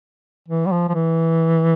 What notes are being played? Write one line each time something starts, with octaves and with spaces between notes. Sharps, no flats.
E3
G3
F3
F3
E3